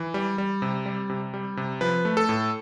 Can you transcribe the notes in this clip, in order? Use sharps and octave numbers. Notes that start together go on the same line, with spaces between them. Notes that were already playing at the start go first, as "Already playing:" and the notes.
Already playing: E3
G3
G3
C3
G3
C3
G3
C3
F3 B4
A3
A4
A2